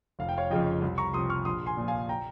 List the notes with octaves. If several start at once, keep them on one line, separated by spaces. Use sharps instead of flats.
F1 F5
G5
C#5 F5
F2 C#3 F3 D#5 G5
C2
A#5 C#6
C3 F3 C6 D#6
C#6 F6
A#1 C6 D#6
G#5 C6
A#2 F3
F5 G#5
G5 A#5